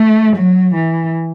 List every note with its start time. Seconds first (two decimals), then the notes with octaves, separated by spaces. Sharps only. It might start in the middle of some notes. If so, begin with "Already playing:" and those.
Already playing: A3
0.36 F#3
0.74 E3